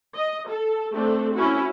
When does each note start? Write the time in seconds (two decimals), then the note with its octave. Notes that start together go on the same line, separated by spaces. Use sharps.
0.16 D#5
0.49 A4
0.93 A3 C4 D4 A4
1.34 C#4 E4 F#4